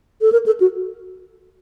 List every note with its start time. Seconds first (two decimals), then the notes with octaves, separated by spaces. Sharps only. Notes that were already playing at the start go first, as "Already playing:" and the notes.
0.21 A4
0.32 A#4
0.46 A4
0.60 F#4